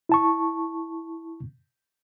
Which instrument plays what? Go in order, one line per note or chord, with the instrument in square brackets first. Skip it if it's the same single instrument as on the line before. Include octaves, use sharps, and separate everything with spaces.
[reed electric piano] E4 A5 C#6